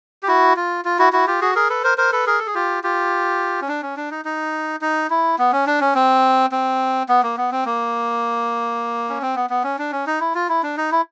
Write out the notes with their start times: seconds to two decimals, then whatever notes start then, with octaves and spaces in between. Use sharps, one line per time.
0.23 G4
0.28 E4 F#4
0.57 F4
0.85 F4
0.99 E4 F#4
1.13 E4 F#4
1.27 F4 G4
1.41 F#4 G#4
1.55 G#4 A#4
1.70 A4 B4
1.84 A#4 C5
1.98 A#4 C5
2.12 A4 B4
2.27 G#4 A#4
2.39 A4
2.47 G#4
2.55 F4 G4
2.83 F4 G4
3.62 C#4
3.68 D4
3.82 C#4
3.97 D4
4.11 D#4
4.25 D#4
4.81 D#4
5.10 E4
5.39 B3
5.52 C#4
5.67 D4
5.81 C#4
5.95 C4
6.52 C4
7.09 B3
7.23 A#3
7.37 B3
7.52 C4
7.65 A#3
9.09 C#4
9.22 C4
9.36 B3
9.50 B3
9.64 C#4
9.79 D4
9.92 C#4
10.07 D#4
10.21 E4
10.35 F4
10.49 E4
10.63 D4
10.77 D#4
10.92 E4